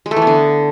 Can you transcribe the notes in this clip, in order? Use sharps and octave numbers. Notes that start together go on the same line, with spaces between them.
G#3
A3
E3
B3
D3